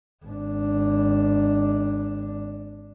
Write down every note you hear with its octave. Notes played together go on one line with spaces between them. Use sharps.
G#1 D4